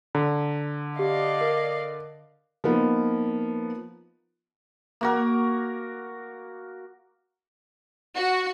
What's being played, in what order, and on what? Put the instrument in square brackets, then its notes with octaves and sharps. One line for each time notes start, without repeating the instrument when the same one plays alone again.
[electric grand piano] D3 [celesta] A#5
[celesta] G4 [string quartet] D5 D#5 F5
[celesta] A#4
[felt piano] F3 A#3 B3 D#4
[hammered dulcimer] A#3 F#4 A#4
[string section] F#4